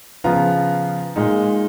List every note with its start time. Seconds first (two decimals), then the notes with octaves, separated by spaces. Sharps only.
0.24 C#3 F3 B3 F4 A#5
1.16 A#2 G#3 D#4